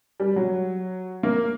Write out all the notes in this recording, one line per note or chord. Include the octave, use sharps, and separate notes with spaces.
G3
F#3
A#3